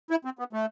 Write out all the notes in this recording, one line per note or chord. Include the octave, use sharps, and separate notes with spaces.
E4
C4
B3
A3